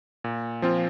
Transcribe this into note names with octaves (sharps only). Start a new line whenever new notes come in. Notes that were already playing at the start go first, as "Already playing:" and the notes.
A#2
F3 C4 F4